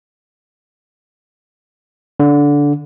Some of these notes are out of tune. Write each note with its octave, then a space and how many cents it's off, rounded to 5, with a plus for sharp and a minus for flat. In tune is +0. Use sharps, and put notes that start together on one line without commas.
D3 -15